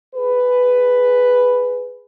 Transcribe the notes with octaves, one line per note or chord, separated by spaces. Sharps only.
G#4 B4